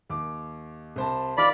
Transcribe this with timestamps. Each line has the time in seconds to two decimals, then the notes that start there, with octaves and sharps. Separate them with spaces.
0.10 D#2 D6
0.96 C2 C5 A5
1.37 D#3 F4 D5 B5 F6